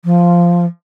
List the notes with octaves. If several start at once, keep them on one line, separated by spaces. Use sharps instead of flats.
F3